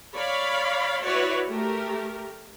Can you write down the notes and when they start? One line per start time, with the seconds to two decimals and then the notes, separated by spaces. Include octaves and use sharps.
0.16 C#5 D5 F5 B5
1.05 E4 F#4 B4 C#5 D5
1.49 A3 G4 A#4